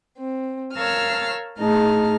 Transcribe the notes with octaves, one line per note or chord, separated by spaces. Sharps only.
C4
A#4 C#5 F5 A5 E6 F6
A2 A3 D#4 G#4 A5 F6